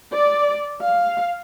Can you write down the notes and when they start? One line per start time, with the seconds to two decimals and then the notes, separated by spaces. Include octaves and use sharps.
0.13 D5
0.82 F5